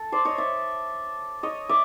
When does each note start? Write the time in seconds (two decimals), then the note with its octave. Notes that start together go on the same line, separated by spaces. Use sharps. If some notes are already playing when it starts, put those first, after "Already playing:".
Already playing: A4
0.12 C5 D5
0.25 C#5 D#5
0.38 D5 E5
1.43 C#5 D#5
1.69 D5 E5